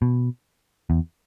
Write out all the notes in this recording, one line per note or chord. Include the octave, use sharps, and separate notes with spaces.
B2
E2